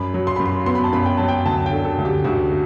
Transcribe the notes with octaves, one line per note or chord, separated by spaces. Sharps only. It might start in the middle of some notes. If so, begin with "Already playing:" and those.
Already playing: F#2 B5
F#3
C6
F#2 B5
C6
B3 C6
B5
A5
F#2 B5
G5
F#3 A5
G5
D2 A5
G5
D3
A4
D2
G4
D2 F#4
A3